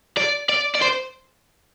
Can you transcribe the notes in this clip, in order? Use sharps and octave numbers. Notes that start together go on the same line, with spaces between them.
D5
D5
D5
C5